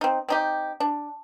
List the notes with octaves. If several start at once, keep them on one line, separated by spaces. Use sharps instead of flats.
C4 D#4
C4 D#4 G4
D4